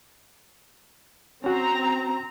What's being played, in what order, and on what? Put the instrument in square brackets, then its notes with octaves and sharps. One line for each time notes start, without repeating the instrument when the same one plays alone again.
[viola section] C4 A#5 [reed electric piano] C#4 F#4